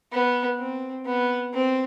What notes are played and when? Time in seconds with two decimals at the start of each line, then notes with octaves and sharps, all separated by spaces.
0.12 B3
0.59 C4
1.06 B3
1.53 C4